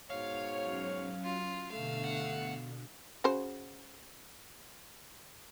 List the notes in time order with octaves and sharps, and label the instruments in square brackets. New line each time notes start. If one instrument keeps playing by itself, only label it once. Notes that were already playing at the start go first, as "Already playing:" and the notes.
[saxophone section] G#2 B2 C#5 [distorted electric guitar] F5
[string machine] F#3 C#4
[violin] F4
[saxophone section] G2 A3 [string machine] B2 D3 [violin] F5 E6
[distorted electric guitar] F#5
[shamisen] C#3 F#4 C5